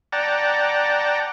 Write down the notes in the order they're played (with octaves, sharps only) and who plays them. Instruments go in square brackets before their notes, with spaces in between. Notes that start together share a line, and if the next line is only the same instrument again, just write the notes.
[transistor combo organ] D5 F#5 G5 A5 A#5